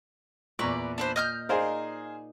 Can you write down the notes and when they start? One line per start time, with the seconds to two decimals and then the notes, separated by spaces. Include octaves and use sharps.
0.59 E2 A#2 B4 D5 A#5 C#6
0.98 D4 B4 C5
1.16 D#5 F6 G6
1.49 D#4 G#4 A#4 C5 D5 F5